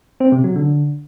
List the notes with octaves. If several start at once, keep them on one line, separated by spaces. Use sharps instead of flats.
C4
C3
F#3
D3